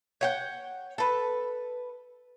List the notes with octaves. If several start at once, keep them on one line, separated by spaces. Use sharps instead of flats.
C#5 F#5 G5
A4 B4